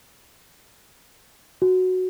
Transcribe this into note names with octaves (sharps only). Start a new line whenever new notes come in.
F#4